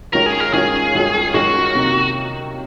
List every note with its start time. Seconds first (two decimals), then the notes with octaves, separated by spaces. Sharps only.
0.13 F#2 D#3 G#3 C#4 F4 A#4
0.26 G#4
0.40 A#4
0.53 F#2 D#3 G#3 C#4 F4 G#4
0.93 F#2 D#3 G#3 C#4 F4
1.34 F#2 D#3 G#3 C#4 F4 F#4
1.75 C3 D#3 F#3 A#3 D#4